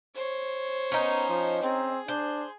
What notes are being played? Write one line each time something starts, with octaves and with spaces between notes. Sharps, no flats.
C5 C#5
B3 C#4 D#4
F3
C4 G#4
D4 C5